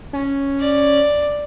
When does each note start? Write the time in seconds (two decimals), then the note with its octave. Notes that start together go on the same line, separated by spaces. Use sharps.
0.13 C#4
0.60 D5